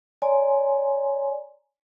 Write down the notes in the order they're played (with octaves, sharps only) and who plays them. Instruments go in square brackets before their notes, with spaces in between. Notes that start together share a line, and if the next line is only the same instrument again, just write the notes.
[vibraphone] C#5 D5 G#5 A#5 C6